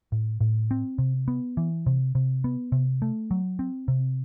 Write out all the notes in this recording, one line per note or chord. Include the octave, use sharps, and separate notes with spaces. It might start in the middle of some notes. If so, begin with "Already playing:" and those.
A2
A2
C4
C3
B3
E3
C3
C3
B3
C3
A3
F#3
C4
C3